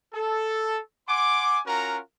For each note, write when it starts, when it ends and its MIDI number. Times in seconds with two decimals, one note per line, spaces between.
0.14 0.79 69
1.08 1.59 78
1.08 1.59 80
1.08 1.59 84
1.08 1.59 86
1.65 1.99 61
1.65 1.99 65
1.65 1.99 66
1.65 1.99 70
1.65 1.99 78
1.65 1.99 82